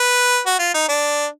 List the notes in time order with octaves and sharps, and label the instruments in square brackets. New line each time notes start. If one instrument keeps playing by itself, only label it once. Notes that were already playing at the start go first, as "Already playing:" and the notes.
Already playing: [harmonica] B4
F#4
F4
D#4
D4